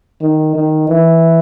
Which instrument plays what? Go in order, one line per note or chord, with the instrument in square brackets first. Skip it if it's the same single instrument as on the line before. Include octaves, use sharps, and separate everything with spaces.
[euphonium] D#3
D#3
E3